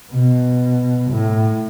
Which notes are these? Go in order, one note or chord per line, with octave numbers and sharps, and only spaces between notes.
B2
A2